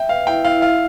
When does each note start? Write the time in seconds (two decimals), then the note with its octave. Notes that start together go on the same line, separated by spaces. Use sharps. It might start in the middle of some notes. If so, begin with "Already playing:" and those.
Already playing: E5 G5
0.09 B4 F5
0.27 E4 G5
0.45 E4 F5
0.62 E5 F5